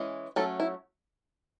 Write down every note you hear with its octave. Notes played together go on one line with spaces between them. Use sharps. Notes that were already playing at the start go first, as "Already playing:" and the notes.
Already playing: E3 G#3 C#4
F#3 A3 C#4 A4
E4